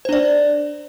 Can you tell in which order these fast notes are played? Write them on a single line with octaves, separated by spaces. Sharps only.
C5 D4 D5